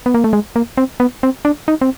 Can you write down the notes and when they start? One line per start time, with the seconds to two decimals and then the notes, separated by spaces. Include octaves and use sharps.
0.06 B3
0.14 A#3
0.24 A3
0.33 G#3
0.56 A#3
0.77 C4
1.00 B3
1.23 C4
1.45 D4
1.68 D#4
1.81 C4